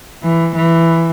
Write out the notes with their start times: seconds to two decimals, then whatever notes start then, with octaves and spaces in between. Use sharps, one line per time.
0.23 E3
0.56 E3